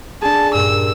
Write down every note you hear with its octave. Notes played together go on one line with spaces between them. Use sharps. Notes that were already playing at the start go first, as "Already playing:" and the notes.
D4 G#4 A5
G2 A#2 E6